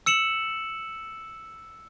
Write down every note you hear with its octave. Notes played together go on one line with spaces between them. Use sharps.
E6 C#7 E7 F#7